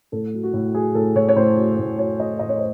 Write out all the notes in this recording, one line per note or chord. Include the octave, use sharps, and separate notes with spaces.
A2 A4
F#3
F#4
A2
F#3 G#4
A2 A4
A2 C#5
C#5
A2 C5
F#3
A2
F#3 C#5
F#3 D#5
A2 D#5
C#5
C5